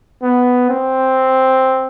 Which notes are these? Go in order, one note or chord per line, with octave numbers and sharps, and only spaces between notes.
B3
C4